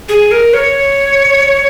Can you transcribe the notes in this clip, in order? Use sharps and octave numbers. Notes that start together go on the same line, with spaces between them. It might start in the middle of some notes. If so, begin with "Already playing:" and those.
G#4
A#4
C#5